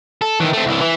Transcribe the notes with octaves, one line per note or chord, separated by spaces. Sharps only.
A4
D#3 E3
A3 C4
C2 E3
E3